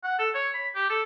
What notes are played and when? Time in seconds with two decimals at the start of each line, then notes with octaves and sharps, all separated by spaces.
0.04 F#5
0.19 A4
0.34 C#5
0.54 B5
0.75 G4
0.90 A4